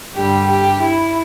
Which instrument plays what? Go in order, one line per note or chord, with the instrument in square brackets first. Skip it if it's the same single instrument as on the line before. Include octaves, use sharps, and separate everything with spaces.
[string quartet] G2 D3 G3 G4
G4
E4